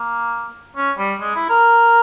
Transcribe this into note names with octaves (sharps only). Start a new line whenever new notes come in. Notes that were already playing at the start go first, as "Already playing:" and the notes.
Already playing: A#3
C#4
G3
G#3
E4
A#4